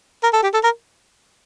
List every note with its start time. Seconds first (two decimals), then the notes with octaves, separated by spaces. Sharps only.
0.23 A#4
0.33 A4
0.43 G4
0.54 A4
0.64 A#4